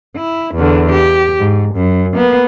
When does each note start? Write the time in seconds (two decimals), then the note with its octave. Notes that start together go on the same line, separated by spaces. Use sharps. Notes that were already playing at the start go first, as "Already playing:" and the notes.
0.17 E4
0.55 E2 D3
0.92 G4
1.39 G#2
1.75 F#2
2.13 A#3 B3